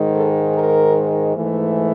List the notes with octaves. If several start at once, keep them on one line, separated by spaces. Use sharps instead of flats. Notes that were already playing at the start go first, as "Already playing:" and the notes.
Already playing: G#2 D#3 G#3
A4
A#4
G#2 E3 A3